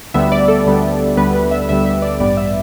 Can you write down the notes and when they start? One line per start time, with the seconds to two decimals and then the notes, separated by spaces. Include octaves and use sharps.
0.14 D2 D3 G3 B3 E5
0.32 D5
0.48 A4
0.66 D2 D3 G3 B3
1.17 D2 D3 G3 B3 B4
1.34 B4
1.51 E5
1.69 D2 D3 G3 B3 E5
1.86 E5
2.02 D5
2.20 A1 G2 G3 B3 D5
2.37 E5